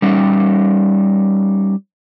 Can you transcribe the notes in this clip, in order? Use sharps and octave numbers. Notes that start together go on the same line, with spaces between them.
G3 C#4 D#4